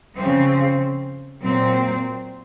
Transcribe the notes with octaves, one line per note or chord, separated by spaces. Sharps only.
C#3 F3 C4
A#2 F#3 C4